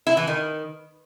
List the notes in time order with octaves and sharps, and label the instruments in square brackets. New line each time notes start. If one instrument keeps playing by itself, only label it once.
[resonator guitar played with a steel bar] E4
E3
D#3